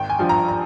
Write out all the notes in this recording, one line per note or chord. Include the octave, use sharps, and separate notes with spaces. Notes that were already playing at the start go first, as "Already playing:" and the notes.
Already playing: G#1 G5
G#5
G2 F3
A#5
A#5